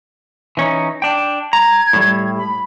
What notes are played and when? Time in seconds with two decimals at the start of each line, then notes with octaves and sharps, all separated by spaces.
0.57 E3 C#4 D#4
1.02 D4 G5
1.53 A#5 G#6
1.93 A2 G3
2.36 B5